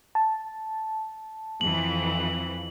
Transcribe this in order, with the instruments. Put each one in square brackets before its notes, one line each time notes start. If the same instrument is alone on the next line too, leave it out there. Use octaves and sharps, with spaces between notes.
[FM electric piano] A5
[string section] F2 E3 [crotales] F#7